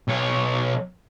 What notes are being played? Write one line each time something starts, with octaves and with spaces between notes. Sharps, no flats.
B1 C#5